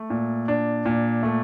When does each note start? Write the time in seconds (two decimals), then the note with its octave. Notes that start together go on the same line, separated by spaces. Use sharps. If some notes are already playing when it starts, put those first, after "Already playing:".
Already playing: A3
0.10 A#2
0.48 D4
0.86 A#2
1.23 A3